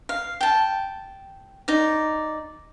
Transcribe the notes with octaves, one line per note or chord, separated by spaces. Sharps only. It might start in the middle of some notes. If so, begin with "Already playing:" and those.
F5
G5 A5
D#4 D5